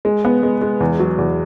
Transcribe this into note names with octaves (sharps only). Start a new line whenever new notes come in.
G#3
B3
G#3
G#3
E2
F#3
E2